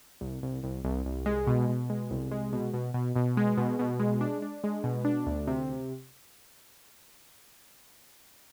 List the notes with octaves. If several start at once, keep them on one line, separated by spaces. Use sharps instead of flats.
C2
C2
C2
C2
C2
G#3
B2
B2
G#3
C2
G#3
B2
B2
B2
B2
G#3
B2
B2
G#3
D4
D4
G#3
B2
D4
D2
C3